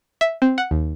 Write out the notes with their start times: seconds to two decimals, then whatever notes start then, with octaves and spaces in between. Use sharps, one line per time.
0.21 E5
0.42 C4
0.58 F#5
0.71 D#2